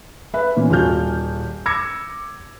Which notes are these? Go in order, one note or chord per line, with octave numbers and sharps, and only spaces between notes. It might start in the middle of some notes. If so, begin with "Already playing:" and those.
B4 E5
A#2 E3 B3 C#4
D#1 F4 F#4 G#4 F6 G6
D6 E6 G#6 A#6 C#7